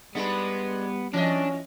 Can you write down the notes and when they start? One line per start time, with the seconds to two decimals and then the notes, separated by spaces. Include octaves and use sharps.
0.15 G3 G#3 B3 D4 B4
1.14 E3 C#4 D4 D#5